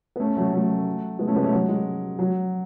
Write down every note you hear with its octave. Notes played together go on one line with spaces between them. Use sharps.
B3
A3 C#4
F#3 A3
F#3 A3
G#3 B3
A3 C#4
G#3 B3
A3 C#4
F#3
G#3
F#3